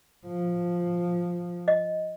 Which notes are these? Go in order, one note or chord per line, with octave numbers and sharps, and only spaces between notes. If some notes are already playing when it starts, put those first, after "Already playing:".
F3
D#5